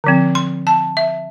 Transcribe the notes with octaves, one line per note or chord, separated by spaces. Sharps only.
D3 F3 C4
C6
A5
E5